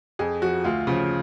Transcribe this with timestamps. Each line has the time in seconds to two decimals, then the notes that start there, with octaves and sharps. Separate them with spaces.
0.19 F2 G#4
0.42 F3 F#4
0.64 D2 F4
0.87 C#3 F3